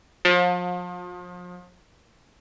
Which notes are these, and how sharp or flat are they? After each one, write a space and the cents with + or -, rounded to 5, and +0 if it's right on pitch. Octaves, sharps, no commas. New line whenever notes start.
F3 +35